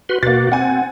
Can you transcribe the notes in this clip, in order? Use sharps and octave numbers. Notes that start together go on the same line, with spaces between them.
F#4 B4 C6
B2 A#3 F#4 A6
C4 F#5 G#5